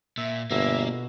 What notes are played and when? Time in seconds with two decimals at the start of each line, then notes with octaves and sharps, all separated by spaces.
0.17 A#2 E5
0.51 G1 B2 A#3 E5